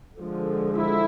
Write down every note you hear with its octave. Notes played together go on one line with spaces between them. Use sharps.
D3 F3 G#3
E4